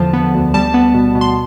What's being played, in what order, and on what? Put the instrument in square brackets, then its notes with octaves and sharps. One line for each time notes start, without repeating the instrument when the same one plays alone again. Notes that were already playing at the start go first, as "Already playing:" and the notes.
Already playing: [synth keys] E2 D3 F3 A5
B3
D2
G3 A5
B3
B2
B2
C6